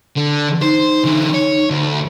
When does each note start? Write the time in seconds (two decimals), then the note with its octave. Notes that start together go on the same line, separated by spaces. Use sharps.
0.17 D3
0.62 D#4 C5
1.04 D3 E3
1.34 C#5
1.70 D2